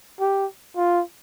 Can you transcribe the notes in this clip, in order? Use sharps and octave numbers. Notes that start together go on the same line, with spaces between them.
G4
F4